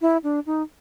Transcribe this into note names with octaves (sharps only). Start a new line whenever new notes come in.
E4
D4
D#4